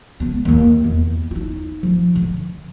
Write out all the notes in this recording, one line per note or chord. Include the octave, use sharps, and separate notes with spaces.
C#2 B3
D#2 A#3
E2
D#4 E4
F3
D3